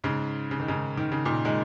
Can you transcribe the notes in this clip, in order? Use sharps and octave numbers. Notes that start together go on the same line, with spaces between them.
G#2 C#3
C#3
D#3
G#2 C#3
D#3
C#3
A#2 D#3
D#3 G#3